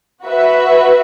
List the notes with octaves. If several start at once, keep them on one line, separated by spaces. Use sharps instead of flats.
F#4 B4 E5